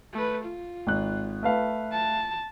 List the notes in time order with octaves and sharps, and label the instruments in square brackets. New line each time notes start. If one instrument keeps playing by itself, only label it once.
[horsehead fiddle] A3 B4
F4
[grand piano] G#1 F#6
A3 B4 F5
[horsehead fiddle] A5